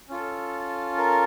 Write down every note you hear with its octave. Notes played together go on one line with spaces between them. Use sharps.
C#4 F4 A4
A#4